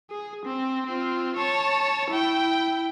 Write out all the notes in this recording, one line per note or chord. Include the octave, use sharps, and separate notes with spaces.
G#4
C4
C4 F4
C#5 A5
E4 G5